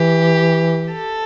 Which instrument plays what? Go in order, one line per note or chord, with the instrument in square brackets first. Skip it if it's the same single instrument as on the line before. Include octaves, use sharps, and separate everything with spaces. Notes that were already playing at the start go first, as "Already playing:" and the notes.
Already playing: [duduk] E3 [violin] G4
[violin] A4